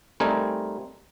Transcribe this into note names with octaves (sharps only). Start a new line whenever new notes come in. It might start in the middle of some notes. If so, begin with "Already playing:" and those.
G3 A3 C4 D#4 A#4 G#5